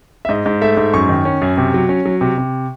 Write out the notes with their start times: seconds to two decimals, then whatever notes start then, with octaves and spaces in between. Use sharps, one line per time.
0.25 E5
0.29 G#2 D#5
0.46 G#2
0.61 A3 E5
0.77 G#2
0.93 F#2 C#6
1.09 D#3
1.25 C#4
1.42 F#2
1.57 C3
1.74 F#3
1.89 C#4
2.05 F#3
2.21 C3
2.38 C3